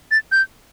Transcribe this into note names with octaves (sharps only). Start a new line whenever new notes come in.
A6
G6